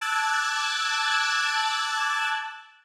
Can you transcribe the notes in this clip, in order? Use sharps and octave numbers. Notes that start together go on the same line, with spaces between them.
A5 D6 E6 F#6 G#6 A6